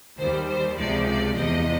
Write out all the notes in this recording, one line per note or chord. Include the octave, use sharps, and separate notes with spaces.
D#2 D#3 G3 C5
C5
C#2 C3 F3 G#3 D5
D5
E2 C3 F3 D#5